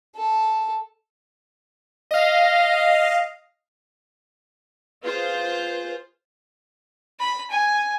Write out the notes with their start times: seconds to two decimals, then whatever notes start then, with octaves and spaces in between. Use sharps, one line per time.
0.15 A4
2.11 D#5 F5
5.03 F4 G#4 B4 C5
7.20 B5
7.50 G#5